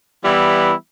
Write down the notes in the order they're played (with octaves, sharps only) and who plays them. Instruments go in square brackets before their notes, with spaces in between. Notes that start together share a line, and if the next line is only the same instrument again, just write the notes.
[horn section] E3 G3 B3 E4